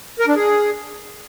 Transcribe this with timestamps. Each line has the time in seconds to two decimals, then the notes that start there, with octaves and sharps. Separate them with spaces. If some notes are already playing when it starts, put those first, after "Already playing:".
0.19 A#4
0.28 D4
0.36 G#4